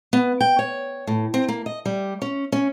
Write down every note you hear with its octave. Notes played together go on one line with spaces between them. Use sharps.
B3
G5
C#5
A2
C4
A#3
D#5
G3
C#4
C#4